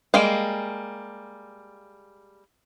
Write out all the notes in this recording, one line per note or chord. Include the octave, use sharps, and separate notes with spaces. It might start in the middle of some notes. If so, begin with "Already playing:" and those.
G3 G#3 A#3 F5